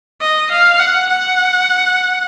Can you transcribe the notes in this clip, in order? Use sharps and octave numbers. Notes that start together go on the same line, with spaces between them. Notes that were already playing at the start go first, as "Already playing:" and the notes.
D#5
F5
F#5
F#5